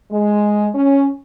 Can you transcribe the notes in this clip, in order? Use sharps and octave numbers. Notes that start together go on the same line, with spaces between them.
G#3
C#4